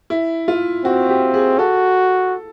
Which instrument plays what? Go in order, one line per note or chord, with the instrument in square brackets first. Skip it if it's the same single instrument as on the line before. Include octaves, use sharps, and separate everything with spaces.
[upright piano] E4
F4
[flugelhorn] C4 [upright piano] F#4
[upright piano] G4
G#4
[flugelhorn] F#4 [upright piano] A4